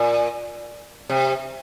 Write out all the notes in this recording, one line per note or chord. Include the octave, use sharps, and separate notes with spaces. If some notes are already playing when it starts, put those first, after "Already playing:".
Already playing: A#2
C3